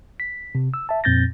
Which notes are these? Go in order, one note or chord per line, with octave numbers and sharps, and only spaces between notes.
B6
C3
E6
E5 A5
F2 A#2 C4 G6 A6 A#6